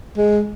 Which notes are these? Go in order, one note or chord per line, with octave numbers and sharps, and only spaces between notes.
G#3